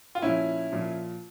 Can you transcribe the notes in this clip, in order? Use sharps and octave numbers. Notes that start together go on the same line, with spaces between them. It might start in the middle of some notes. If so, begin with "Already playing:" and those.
F4
A#2 F3 C#4 E4
A#2 F3